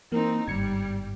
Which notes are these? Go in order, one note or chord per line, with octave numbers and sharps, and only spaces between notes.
E3 A#3 C4 D#4
G1 G#2 G3 G#6 C#7